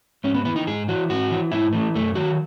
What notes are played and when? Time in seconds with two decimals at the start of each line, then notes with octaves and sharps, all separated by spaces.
0.24 G#2 C#4
0.34 B3
0.45 E3 B3
0.56 D#4
0.67 G#2 G#4
0.88 E3 F#4
1.10 G#2 F#4
1.31 E3
1.52 G#2 E4
1.73 E3 A3
1.95 F#2 A3
2.15 D#3 F#3 F#4